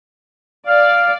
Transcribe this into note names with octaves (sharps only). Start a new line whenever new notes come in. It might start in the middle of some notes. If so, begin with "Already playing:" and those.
D5 F5